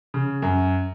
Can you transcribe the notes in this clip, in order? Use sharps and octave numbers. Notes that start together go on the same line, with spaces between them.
C#3
F#2